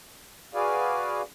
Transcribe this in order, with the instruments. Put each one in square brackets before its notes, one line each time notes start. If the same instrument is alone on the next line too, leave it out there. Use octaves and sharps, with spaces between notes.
[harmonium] F#4 G#4 B4 D5 F5 G#5